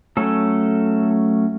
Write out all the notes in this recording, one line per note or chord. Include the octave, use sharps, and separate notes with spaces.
F#3 A3 C#4 A4